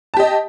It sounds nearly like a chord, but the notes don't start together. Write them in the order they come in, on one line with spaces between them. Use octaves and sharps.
A5 G4 D#5